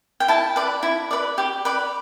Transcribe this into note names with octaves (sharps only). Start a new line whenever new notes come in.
G5
E4 A5
B4 D5
E4
B4 D5
G4
B4 D5